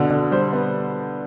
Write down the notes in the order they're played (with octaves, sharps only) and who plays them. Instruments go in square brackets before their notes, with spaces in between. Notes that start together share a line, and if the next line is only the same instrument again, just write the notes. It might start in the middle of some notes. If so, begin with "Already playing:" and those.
Already playing: [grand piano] B2 D3
D3
G3 C5
B3